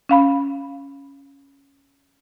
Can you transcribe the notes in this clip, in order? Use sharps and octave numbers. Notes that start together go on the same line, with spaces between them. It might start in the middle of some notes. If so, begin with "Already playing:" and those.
C#4 F5 B5